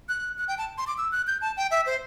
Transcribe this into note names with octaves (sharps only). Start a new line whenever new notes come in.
F#6
F#6
G5
A5
C6
D6
E6
F#6
G6
A5
G5
E5
C5